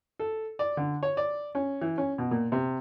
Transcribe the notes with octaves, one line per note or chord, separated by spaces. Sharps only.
A4
D5
D3
C#5
D5
C#4
E3
C#4
B2
A#2
C3